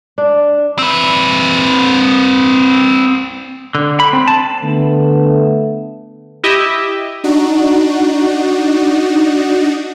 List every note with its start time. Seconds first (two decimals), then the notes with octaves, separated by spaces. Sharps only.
0.18 D4
0.79 C4 B4
3.75 D3
4.00 B5
4.13 C4
4.28 A5
4.62 D3 A3 B3
6.44 E4 G4 D#5 E5
7.24 D4 D#4 F#4